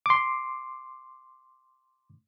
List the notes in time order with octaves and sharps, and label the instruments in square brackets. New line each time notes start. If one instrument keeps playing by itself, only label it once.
[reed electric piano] C6 D6